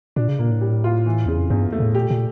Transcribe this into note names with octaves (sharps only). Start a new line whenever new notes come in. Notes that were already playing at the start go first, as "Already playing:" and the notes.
A#2 D4
C#3
A#2 A#3
A2
G3
F4
E3
E2 C#3
F2
E2 G2
A3
A2
A#2 G4
A#2